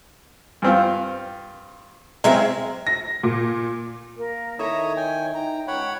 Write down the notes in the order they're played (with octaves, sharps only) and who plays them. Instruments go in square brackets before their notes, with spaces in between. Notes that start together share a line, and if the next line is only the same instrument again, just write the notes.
[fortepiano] G2 C4 F4
[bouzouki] F#3 E5 F5 [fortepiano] G#3 C4
[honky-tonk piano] A#6
A#2
[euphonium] A#3 [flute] A#4
[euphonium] D#3 [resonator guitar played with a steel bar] E4 A4 E5 [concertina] C#5 A#5 D#6 [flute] A5
[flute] C#5 [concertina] G5 G#5
[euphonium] D#4 [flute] G5 [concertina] A#5
[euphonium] C#2 [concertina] C#5 F#5 B5